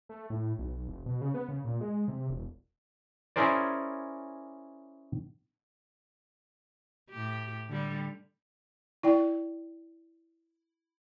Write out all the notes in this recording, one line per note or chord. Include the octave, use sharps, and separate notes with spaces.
A3
A2
B1
F1
B2
C#3
B3
C#3
A#2
G#3
C3
E1
C#4 E4 G#4 A#4 C5 D5
A2 G4
D3 G3
E4 D5 G5